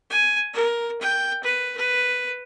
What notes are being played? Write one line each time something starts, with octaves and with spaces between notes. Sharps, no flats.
G#5
A#4
G5
B4
B4